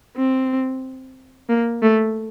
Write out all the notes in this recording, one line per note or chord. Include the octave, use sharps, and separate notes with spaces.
C4
A#3
A3